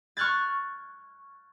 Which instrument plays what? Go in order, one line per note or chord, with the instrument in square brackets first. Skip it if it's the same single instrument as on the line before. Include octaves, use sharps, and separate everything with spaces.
[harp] C#6 F6 F#6 G#6 A6